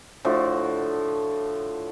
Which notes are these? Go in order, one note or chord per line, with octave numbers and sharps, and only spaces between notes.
A2 D3 F3 F#4